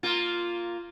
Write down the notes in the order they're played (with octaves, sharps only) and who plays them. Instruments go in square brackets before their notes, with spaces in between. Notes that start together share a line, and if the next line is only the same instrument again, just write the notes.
[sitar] A#3 F4